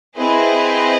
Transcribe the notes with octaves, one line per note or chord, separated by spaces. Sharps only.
C4 E4 G#4 B4 D#5